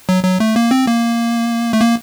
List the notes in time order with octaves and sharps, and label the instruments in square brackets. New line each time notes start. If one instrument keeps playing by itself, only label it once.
[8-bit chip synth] F#3
F#3
A3
A#3
C4
A#3
A3
A#3